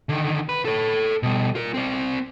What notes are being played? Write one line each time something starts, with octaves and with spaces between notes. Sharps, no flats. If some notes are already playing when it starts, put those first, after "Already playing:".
D3 D#3
B4
A4 C#5
B2 G3
F4 A#4
C4 D5